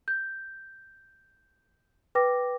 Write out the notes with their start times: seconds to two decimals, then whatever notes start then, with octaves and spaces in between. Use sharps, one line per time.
0.08 G6
2.15 B4 G5 D6 A#6